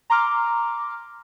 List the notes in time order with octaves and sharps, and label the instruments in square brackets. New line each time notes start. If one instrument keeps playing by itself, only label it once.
[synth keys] A#5 C6 D6 F6